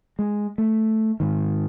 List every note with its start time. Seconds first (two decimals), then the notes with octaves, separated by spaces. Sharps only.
0.19 G#3
0.58 A3
1.20 G#2 D#3